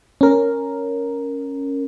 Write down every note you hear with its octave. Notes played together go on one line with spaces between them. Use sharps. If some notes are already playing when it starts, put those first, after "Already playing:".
C#4 A#4